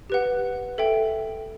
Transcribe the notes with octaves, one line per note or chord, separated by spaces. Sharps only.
G4 B4 F#5
A4 E5 G5